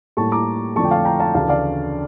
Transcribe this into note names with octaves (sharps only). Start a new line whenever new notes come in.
A2 G3 A#3 A5 C#6
A#5 D6
F2 D3 F3 A3 A5 C#6
G5
F5 A5
G5 A#5
F5 A5
D2 C#3 E3 F5 A5
D5 F5